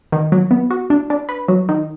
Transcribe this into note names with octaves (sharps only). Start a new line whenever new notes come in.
D#3
F#3
B3
F#4
D4
D4
B4
F#3
D#3